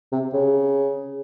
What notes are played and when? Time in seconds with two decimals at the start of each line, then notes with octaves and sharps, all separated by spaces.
0.12 C3
0.34 C#3